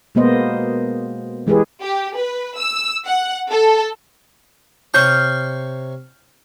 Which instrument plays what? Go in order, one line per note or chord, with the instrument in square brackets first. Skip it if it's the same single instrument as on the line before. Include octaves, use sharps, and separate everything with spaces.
[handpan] B2 G#3 A#3 B3 C5 D#5
E3 G#3 G4 G#4 B4
[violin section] G4
B4
E6
F#5
A4
[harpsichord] C3 C#5 C#6 [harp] F6 G6 C7